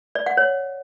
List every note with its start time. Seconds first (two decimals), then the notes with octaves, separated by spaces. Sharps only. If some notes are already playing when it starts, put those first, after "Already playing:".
0.15 D5
0.26 F#5
0.37 C#5